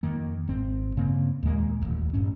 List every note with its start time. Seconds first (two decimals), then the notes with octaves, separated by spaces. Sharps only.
0.03 F2 D#3 A#3
0.48 G#1 C4
0.97 G2 C#3 A#3 C4
1.43 D#2 A#2 G#3 A#3
1.81 D#1 A1 D#2
2.13 A1 G2 C#4